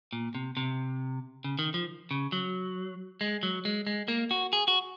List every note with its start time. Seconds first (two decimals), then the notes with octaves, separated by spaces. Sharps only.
0.13 A#2
0.35 C3
0.57 C3
1.44 C#3
1.59 D#3
1.74 F3
2.11 C#3
2.32 F#3
3.21 G#3
3.43 F#3
3.65 G#3
3.87 G#3
4.08 A#3
4.31 F#4
4.53 G#4
4.68 F#4